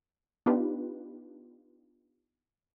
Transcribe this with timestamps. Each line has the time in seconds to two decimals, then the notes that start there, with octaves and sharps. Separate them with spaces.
0.46 B3 D4 D#4 F4 G4 B4